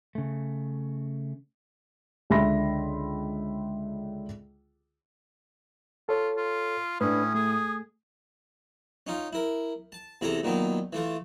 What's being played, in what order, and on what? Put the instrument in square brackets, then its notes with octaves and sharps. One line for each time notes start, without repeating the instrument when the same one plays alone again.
[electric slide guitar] C#3 A3
[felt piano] C#2 D3 E5 B5 C6 A#6
[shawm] F4 [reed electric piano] A4 C#5
[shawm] F4
[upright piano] A2 [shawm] C#4 [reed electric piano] D4 B4 [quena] D#6
[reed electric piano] A3 [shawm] G#4
[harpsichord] C#4 D#4 F4
E4 A#4
A5
E2 C3 E4 A4 A#5
A#2 D#3 F#3 B3
E3 A3 F4